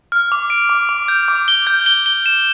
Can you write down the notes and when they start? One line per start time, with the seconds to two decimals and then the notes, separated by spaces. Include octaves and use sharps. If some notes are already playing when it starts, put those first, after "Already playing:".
0.12 F6
0.32 D6
0.50 D7
0.69 D6
0.89 D6
1.08 G6
1.28 D6
1.48 G7
1.67 G6
1.86 G7
2.06 G7
2.26 E7